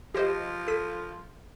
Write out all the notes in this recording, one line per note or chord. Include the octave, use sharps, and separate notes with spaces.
F3 G4 C5 D#5
A4 B6 D#7